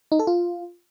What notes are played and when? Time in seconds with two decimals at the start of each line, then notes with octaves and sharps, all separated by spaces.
0.12 D#4
0.19 A4
0.27 F4